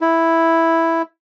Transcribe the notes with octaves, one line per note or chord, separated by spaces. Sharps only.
E4